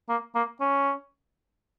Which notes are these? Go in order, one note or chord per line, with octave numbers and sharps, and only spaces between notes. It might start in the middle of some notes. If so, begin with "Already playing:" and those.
A#3
A#3
C#4